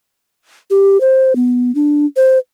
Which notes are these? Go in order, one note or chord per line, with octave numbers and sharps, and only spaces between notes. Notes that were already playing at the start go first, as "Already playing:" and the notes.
G4
C5
B3
D4
C5